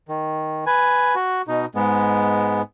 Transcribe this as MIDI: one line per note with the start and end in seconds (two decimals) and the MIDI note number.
0.09 0.65 51
0.67 1.15 71
0.67 1.15 80
1.15 1.42 66
1.48 1.65 47
1.48 1.65 63
1.75 2.62 44
1.75 2.62 56
1.75 2.62 59